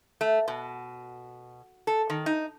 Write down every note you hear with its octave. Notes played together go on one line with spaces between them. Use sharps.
A3
B2
A4
D#3
D#4